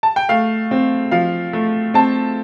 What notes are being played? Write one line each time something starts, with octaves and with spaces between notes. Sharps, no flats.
A5
G5
A3 F5
C4
F3 F5
A3
C4 A5